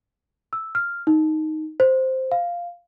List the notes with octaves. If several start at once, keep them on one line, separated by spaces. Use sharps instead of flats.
E6
F6
D#4
C5
F5